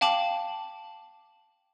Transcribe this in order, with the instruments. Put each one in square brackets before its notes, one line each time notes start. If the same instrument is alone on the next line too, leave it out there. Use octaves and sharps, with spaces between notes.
[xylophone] F5 G5 A5 D6 F#7